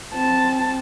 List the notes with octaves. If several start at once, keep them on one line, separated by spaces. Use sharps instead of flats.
C4 A5